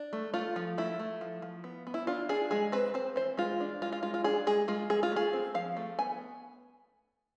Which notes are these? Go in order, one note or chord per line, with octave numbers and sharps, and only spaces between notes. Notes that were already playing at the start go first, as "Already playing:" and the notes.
Already playing: D4
A3
A3 F4
F3
A3 E4
A3
F3
F3
B3
B3
E4
D4 F4
D4 G#4
G#3 G#4
C4 B4
C4 C5
E3 C5
G#3 F4
D4
G#3 F4
F4
G#3 F4
F4
D4 G#4
G#3 G#4
G#3 F4
G#3 G#4
F4
A3 G#4
C4
F3 F5
A3
B3 G#5